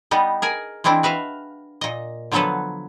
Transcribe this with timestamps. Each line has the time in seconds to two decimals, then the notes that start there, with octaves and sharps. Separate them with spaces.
0.11 G3 B3 D#4
0.42 G#4 A#4 G#5
0.84 E3 G#3 C4 D4 E4
1.03 F#4 B4 E5 F5
1.81 A#2 D#5
2.32 D3 F3 F#3 B3 A4 B4